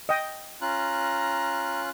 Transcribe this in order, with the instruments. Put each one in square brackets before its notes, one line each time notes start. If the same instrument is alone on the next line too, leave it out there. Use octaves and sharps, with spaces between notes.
[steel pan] D#5 G5
[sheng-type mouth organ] C#4 F4 F#6 [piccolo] A#5